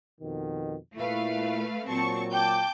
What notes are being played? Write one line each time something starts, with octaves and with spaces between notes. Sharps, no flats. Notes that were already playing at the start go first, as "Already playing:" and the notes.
F2 B2 D#3
A#2 A3 E4 B4 F5
A#2 F#3 C4 A5 C#6
G5 A5 D6 G6